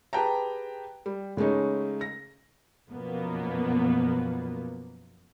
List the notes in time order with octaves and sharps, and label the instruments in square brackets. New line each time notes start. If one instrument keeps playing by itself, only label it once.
[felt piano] G4 G#4 B4 G5 A5 A#5
G3
C#3 G#3 A3 C#4 D#4
A#6
[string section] F#2 B2 F3 A#3 B3